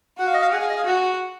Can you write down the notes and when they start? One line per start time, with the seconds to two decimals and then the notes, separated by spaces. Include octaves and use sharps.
0.18 F#4 F#5
0.27 F5
0.34 D#5
0.42 F5
0.52 G#4 F#5
0.61 F5
0.70 D#5
0.77 F5
0.85 F#4 F#5